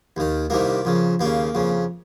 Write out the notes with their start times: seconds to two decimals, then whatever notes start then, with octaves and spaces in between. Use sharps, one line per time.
0.17 D#2 D#3
0.50 C2 C3 D#3 A#3
0.85 F2 C#3
1.20 D#2 C#3 A#3
1.55 F2 C#3